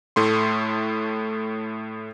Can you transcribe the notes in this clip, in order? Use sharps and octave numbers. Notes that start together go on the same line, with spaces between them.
A2 A3 C6